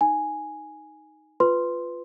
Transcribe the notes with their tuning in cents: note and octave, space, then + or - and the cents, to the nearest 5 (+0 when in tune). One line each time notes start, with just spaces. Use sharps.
D#4 +0 G#5 +0
F4 +0 B4 +15 C6 +0